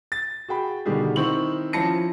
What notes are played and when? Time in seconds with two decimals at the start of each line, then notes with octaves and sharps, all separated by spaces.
0.12 A6
0.48 F#4 G#4 G5 B5
0.85 B2 D3 D#3 G3 G4 G#4
1.16 D#3 C4 D#4 E4 C#6 F#7
1.73 F3 C#4 E4 A5 A#6 C#7